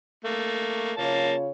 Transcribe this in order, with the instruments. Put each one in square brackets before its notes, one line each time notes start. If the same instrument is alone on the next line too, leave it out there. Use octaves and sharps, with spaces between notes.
[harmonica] A3 A#3
[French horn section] C#3 F4 C#5 [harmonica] A#3 A5